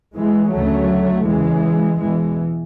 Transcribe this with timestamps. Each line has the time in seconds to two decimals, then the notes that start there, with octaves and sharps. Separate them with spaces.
0.17 E3 G#3
0.54 D2 C#3 F#3 A3
1.27 E2 C#3 E3 G#3
2.01 E2 B2 E3 G#3